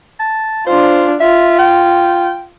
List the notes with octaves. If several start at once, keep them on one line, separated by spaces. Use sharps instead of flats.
A5
D4 F4 C5
F4 E5
G5